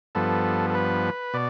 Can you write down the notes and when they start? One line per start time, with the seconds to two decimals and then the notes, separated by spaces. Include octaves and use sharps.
0.15 G2 F3 B3 A4
0.70 A4
0.75 B4
1.34 B2 D5